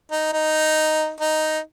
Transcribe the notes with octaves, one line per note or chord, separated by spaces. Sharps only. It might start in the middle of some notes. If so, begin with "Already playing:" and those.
D#4
D#4
D#4